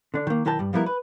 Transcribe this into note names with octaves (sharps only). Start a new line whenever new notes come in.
D3 D4
D#3 A#3
B1 D#3 E4 A#4 G5 A5
G2 G3
F3 G3 B3 E4 A#4
B4